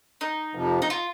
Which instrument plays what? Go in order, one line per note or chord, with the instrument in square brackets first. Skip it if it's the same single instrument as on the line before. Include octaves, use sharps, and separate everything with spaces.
[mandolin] D#4
[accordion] F2 C3 F3
[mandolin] D#4
F4